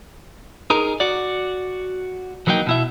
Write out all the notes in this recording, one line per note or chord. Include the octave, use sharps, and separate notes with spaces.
D#4 G#4 A#4
F#4 D5
E3 F#3 A#3 D#4 G5
B2 E4 E5